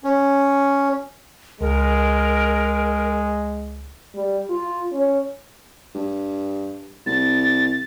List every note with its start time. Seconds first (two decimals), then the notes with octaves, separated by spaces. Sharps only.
0.04 C#4
1.61 C#2 G#3 A#4
4.14 G3
4.50 F4
4.92 C#4
5.95 G2
7.06 C2 A6